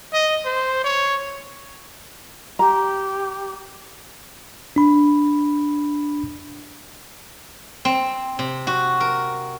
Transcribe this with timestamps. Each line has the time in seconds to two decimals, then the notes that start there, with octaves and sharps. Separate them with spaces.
0.13 D#5
0.45 C5
0.84 C#5
2.59 G4 A#5
4.76 D4 B5
7.85 C4
8.39 C3
8.67 F#4
9.00 A#4